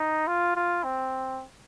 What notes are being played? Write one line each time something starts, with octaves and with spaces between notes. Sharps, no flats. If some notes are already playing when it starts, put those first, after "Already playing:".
Already playing: D#4
F4
F4
C4